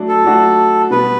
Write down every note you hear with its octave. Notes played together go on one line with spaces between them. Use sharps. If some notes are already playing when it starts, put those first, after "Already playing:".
Already playing: F#3 A3 D4
A4
F#3 A3 D4 F#4
B2 G3 B3 B4